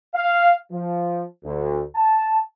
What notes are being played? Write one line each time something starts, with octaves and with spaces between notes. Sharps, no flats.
F5
F3
D2
A5